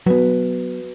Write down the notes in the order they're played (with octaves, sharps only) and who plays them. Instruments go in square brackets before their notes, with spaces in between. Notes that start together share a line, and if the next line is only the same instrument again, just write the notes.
[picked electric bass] F#3 B3 [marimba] F#4 B4